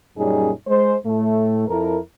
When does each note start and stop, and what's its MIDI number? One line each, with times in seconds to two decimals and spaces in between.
0.18 0.51 42
0.18 0.51 46
0.18 0.51 55
0.18 0.51 61
0.18 0.51 63
0.18 0.51 68
0.67 0.94 56
0.67 0.94 72
1.05 1.65 45
1.05 1.65 57
1.68 1.98 41
1.68 1.98 64
1.68 1.98 69
1.68 1.98 70